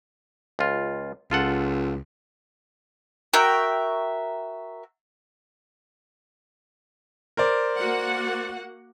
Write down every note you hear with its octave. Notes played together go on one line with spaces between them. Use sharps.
C#2 F4
C#2 F4 A4 F#5
F#4 A#4 E5 G5
A#4 C5 D5
A#3 F#4 F#5